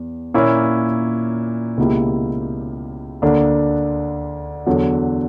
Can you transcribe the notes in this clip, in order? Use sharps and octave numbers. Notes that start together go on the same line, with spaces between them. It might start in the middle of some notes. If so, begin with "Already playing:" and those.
Already playing: E2
A#2 A#3 C#4 E4
C#2 B2 A#3 E4 G4
D2 D3 A#3 D4
E2 D3 F#3